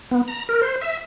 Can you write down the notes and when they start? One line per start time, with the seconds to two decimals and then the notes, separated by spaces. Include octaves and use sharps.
0.11 B3
0.28 A#5
0.49 A#4
0.62 C5
0.81 E5